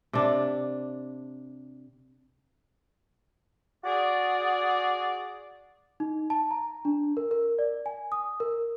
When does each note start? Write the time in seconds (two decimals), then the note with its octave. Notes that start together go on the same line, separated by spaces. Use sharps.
0.13 C3 D4
3.84 F#4 G#4 D5
6.00 D#4
6.30 A5
6.51 A#5
6.85 D4
7.17 A#4
7.31 A#4
7.59 D5
7.86 G#5
8.12 D#6
8.40 A#4